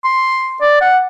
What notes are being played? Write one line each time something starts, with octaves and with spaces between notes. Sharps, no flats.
C6
D5
F#5